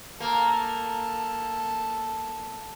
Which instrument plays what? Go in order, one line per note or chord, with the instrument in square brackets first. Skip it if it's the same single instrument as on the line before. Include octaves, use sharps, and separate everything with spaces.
[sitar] A#3 [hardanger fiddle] A4